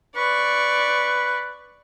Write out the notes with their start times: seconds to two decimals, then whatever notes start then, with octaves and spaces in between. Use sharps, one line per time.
0.16 B4 D5 C#6